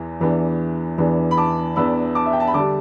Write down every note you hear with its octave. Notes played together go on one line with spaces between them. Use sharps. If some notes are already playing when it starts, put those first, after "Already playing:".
Already playing: E2 E3 B3
E2 E3 B3 D4
E2 E3 B3 D4
B5
A5 D6
E2 E3 B3 D4 B5 E6
A5 D6
E5
G5
A5
B5
D3 G3 D4 A5 D6